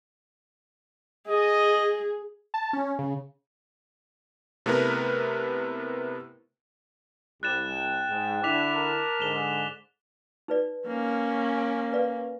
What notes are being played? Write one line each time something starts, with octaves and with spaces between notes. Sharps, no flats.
G#4 D#5
A5
C#4
C#3
C3 A3 B3 E4 A#4 B4
C2 G3 F#6 A6 E7
G5
G#2
D3 D4 E4 D6 B6 F7
A#4 A5
G#2 D3 E7 F7 G7
D#4 B4 D5
A#3 C#4
G#5
B4 D5 F5